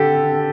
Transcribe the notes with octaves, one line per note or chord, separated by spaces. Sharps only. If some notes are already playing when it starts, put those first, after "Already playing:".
Already playing: D3 G4 A4